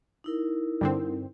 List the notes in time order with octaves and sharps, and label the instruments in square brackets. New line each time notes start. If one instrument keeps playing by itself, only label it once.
[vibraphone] D#4 E4 A#4
[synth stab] G2 D3 C4